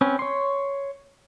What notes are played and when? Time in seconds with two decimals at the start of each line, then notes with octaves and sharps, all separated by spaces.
0.01 C4 C#4 B4
0.19 C#5 C6